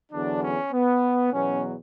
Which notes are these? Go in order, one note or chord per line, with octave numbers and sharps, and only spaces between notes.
E2 D3 F#3 D4
C#4
B3
E2 B2 F#3 C#4